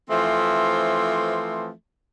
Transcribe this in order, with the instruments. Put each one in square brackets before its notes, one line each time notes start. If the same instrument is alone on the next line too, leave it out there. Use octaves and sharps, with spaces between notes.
[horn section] E3 F3 A3 C4